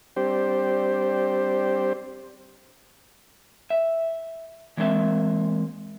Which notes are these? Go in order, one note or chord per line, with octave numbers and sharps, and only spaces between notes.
G3 C4 D4 G4 C5
E5
E3 G#3 A#3 C4 E5